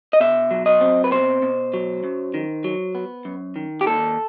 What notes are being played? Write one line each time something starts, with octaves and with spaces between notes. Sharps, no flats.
D#5
B2 E5
F#3
D#5
C4
B4
B2 C5
B2
F#3
F#2
D#3
F#3
B3
F#2
D#3
G4
D#2 A4